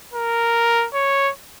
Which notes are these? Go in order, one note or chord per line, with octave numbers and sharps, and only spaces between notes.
A#4
C#5